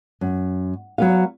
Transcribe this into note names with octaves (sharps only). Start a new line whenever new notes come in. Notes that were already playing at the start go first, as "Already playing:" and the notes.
F#2
F#3 B3 F5